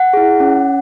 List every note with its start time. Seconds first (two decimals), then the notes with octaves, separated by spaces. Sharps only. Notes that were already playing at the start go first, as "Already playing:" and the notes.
Already playing: F#5
0.13 E4 G#4
0.40 C#4